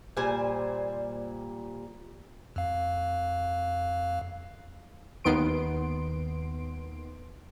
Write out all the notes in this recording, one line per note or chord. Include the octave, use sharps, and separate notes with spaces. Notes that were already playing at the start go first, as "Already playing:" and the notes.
A#2 G3 C5 G#5
F2 F5
D#2 D#3 B3 C6 D7